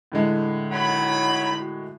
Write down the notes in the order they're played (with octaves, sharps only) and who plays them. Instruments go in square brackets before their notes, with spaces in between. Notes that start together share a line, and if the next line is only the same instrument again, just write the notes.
[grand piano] A2 D3 G#3
[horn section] D#3 F#3 B5 [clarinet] F#5
[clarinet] F#4